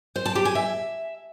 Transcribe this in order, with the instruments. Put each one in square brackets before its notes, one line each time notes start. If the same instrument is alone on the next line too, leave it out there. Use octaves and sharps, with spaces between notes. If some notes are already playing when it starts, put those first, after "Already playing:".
[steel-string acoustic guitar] C5
A5
G4
G#5
E5